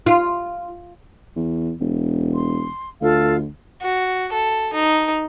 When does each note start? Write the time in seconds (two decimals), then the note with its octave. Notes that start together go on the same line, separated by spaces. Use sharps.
0.06 F4
1.36 E2
1.80 E1
2.35 C6
3.01 D2 F4 A4 F5
3.82 F#4
4.33 A4
4.73 D#4